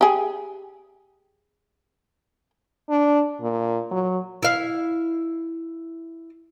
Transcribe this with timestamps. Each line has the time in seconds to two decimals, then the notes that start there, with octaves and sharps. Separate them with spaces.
0.01 G4 G#4
2.89 D4
3.42 A#2
3.91 F#3
4.43 E4 F5